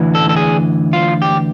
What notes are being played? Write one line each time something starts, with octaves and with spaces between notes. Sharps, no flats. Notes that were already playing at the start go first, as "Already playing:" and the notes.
Already playing: D2 E3
A4
A4
G#4
F4
G4